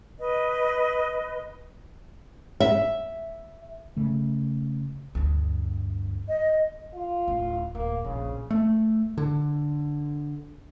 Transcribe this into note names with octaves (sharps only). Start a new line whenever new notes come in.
B4 D#5
E5
C#3 A3
D2 G2
D#5
F4
D1 C#4
D1 A#3
A#1 D#2 C#3
A3
D3